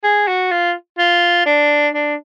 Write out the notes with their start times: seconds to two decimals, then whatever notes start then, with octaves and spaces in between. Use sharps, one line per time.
0.04 G#4
0.27 F#4
0.51 F4
0.98 F4
1.46 D4
1.93 D4